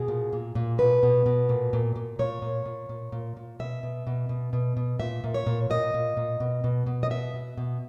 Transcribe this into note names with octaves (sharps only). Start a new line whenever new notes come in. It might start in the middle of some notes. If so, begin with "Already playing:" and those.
Already playing: B2 G#4
A#2
A#2
A#2
B2 B4
B2
B2
A#2
A#2
A#2
A#2 C#5
A#2
A#2
A#2
A#2
A#2
B2 E5
B2
B2
B2
B2
B2
A#2 E5
A#2
C#5
A#2
A#2 D#5
A#2
A#2
B2
B2
B2
D#5
B2 E5
B2
B2